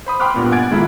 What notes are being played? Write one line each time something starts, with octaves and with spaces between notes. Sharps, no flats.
C5 B5 D#6
G5 B5 C6 D6 F6 F#6
G2 A#2 B3
F#5 G#5 F#6 G#6 A6 D7
D#3 G#3 A#3 E4 F4 A4